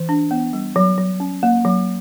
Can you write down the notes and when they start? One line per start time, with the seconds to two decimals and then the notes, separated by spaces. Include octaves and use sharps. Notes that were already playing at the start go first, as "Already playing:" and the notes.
Already playing: E3
0.09 D4
0.31 B3
0.53 G3
0.76 F#3
0.98 F#3
1.20 C#4
1.43 A#3
1.65 F#3